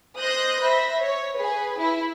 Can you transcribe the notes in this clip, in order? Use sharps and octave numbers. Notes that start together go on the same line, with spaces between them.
C5 D#5 D#6 F#6 G6 A#6
C5 E5 B5 A#6
C#5
G#4 B4
E4